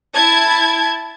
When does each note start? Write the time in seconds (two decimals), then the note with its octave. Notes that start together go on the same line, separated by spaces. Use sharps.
0.15 E4 A5 G#6